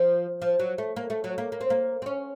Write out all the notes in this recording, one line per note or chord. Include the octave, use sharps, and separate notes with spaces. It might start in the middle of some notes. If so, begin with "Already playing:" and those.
Already playing: F3
F3
F#3
A3
A#3
A3
F#3
A#3
A#3
C4
A#3
C4
C#4